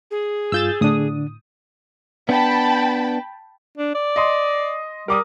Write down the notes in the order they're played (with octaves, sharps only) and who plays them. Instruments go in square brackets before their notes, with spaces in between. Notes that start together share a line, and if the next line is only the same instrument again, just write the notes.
[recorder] G#4
[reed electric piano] G2 F4 [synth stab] E6 G6 A6
[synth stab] A2 D#6 [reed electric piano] D3 D4
[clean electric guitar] B3 D4 [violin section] G5 A5 B5
[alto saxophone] D4
D5
[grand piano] D#5 C6
[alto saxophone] G3 [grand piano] A#4 D6 D#6